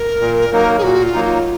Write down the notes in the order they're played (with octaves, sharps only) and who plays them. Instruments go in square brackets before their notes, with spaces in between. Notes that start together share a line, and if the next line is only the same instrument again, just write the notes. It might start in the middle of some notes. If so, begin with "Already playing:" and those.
Already playing: [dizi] A#4
[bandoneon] A#2
F#3 A#3 D#4
[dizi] G#4
[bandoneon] A#2 [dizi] F#4
[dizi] F4
[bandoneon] F#3 A#3 D#4
[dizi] F4